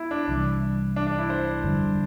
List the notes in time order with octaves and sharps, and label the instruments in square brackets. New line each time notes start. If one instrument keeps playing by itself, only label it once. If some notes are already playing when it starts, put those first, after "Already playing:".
Already playing: [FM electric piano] B3 [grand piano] E4
[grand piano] D4
[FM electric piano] C2 C3 E3 G3
[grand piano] D4
D4
E4
C5
[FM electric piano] G1 F2 D3 G3 D4